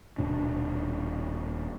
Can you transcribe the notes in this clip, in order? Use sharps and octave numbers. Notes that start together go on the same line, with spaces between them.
D#1 B2 D4